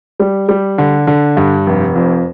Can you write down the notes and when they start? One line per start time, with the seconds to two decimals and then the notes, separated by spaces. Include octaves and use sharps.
0.20 G3
0.49 G3
0.78 D3
1.07 D3
1.37 G2
1.67 F1
1.95 F2